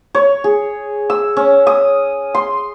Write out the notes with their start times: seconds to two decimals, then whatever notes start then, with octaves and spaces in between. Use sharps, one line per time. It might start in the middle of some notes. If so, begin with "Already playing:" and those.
0.15 C#5
0.44 G#4
1.10 E6
1.37 C#4
1.67 D#6
2.34 C6